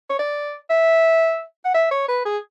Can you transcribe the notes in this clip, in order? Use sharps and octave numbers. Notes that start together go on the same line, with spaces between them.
C#5
D5
E5
F#5
E5
C#5
B4
G#4